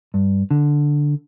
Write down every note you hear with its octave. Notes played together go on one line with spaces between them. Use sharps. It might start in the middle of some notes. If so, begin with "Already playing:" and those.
G2
D3